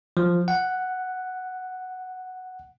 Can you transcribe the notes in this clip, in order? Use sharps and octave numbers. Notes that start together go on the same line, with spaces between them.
F3
F#5